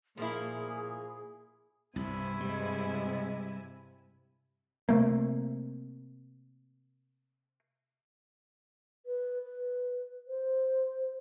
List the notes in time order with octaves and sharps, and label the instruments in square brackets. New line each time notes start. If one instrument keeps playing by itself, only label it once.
[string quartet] A#2 [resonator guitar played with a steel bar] F3 A#3 E4 [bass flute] G#4
[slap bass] C2 [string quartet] G2 E4 G#5 [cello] C3
[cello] C3 [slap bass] G3 [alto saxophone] G#3
[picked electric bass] C3 A3 A#3
[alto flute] B4
B4
C5